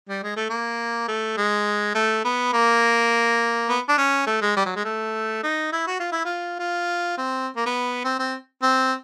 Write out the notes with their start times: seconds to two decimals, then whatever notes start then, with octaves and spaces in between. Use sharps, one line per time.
0.09 G3
0.23 G#3
0.36 A3
0.50 A#3
1.08 A3
1.37 G#3
1.95 A3
2.25 B3
2.53 A#3
3.69 B3
3.89 D4
3.98 C#4
4.27 A3
4.42 G#3
4.57 G3
4.66 F#3
4.76 G#3
4.85 A3
5.43 D#4
5.73 E4
5.87 F#4
6.00 F4
6.12 E4
6.25 F4
6.59 F4
7.18 C4
7.56 A#3
7.66 B3
8.04 C4
8.19 C4
8.62 C4